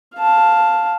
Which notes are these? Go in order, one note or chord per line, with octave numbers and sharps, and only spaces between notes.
F5 A5